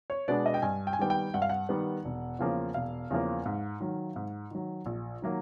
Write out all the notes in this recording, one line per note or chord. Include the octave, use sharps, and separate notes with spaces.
C#5
B2 G#3 B3 D4 D5
D#5
G5
G2 G#5
G5
G#5
D#3 G3 B3 G5
G5
G2 F#5
F5
F#5
D#3 G3 B3
E1
E2 C#3 F3 A#3
E1 F5
E2 C#3 F3 A#3
G#2
D#3 F#3
G#2
D#3 F#3
A#1
D#3 F#3 A#3